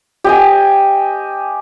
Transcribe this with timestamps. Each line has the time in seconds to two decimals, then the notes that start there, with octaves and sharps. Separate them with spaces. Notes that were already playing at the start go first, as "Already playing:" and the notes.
0.24 G4 D#5 G#5